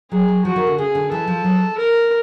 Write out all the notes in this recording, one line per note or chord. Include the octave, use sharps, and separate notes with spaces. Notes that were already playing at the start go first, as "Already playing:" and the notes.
F#3 G#4
F#3
F3 F#4
D#3
D3
C#3 G#4
D3
E3 A4
F3
F#3
A#4